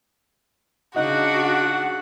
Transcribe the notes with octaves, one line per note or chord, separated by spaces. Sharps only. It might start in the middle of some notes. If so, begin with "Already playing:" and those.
C#3 D4 D#4 F#4 F#5